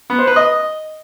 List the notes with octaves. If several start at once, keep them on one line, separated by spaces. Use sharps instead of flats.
B3
C5
B4
D#5